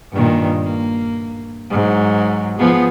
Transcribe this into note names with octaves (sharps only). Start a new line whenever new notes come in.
G2 A#2 D#3
A#3
G#2 F#3
F3 B3 G#4